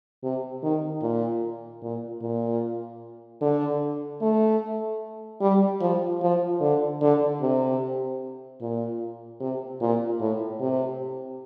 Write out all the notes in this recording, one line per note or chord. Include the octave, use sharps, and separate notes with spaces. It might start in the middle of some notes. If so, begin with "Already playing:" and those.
C3
D#3
A#2
A#2
A#2
D3
A3
G3
F3
F3
D3
D3
C3
A#2
C3
A#2
A2
C3